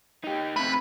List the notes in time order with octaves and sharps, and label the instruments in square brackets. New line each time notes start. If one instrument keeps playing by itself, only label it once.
[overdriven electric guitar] D#4 G4
[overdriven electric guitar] C3 A3 [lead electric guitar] B4